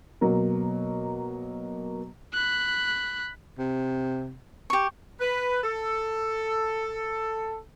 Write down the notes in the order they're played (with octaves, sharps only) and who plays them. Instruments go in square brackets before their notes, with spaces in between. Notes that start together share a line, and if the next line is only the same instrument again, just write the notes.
[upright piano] B2 F#3 A#3
[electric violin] B5 F#6
[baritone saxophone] C3
[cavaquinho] G4 C#6
[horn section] B4
A4